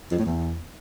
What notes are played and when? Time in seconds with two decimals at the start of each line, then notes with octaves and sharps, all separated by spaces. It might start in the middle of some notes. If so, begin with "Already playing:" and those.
0.11 F2
0.18 A2
0.25 E2